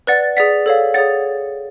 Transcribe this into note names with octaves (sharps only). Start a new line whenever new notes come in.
B4 D5 F#5 A6
G#4 D5 F#5 B6
A4 C#5 F5
G#4 C#5 F#5 A6